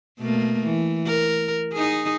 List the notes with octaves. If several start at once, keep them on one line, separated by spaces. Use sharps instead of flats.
B2 A3 A#3
E3
A#4
D#4 G#4